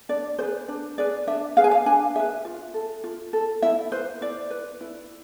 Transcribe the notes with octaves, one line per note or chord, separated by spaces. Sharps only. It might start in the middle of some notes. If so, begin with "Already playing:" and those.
D4 D5
G#4 B4 C5
D4
G#4 B4 D5
D4 E5
G#4 B4 F5
G#5
F5
D4 G#5
G#4 B4 E5
F4
A4
F4
A4
E4 E5
B4 C5
E4 D5
B4
E4